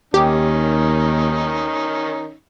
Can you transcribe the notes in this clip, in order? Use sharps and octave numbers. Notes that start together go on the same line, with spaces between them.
D#2 D#3 C#4 D#4 G4